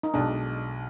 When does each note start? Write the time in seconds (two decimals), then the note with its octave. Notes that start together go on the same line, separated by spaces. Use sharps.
0.03 D#4
0.14 B1 B2 G#3 D4